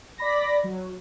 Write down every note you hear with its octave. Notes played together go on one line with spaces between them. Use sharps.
D5 B5 A#6
F#3